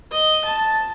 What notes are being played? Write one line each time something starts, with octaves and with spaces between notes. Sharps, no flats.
D#5
A5